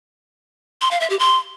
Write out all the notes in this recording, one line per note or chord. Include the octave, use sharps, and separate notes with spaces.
C6
F5
E5
G4
C6